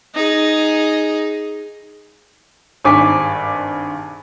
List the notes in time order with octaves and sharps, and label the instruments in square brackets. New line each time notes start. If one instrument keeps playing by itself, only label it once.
[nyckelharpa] D#4 G#4
[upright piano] G#1 G2 G#5 C#6 D6 B6